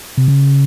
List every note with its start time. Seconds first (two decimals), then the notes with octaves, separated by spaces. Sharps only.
0.17 C3
0.28 C#3